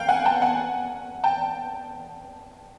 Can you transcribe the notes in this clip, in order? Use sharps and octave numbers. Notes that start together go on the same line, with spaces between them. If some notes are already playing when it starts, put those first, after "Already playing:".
Already playing: F5 G5
F#5 G#5
G5 A5
F#5 G#5
G5 A5